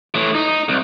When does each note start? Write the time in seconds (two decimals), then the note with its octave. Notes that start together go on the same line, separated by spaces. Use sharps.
0.15 A2 E3
0.35 D#4
0.69 C2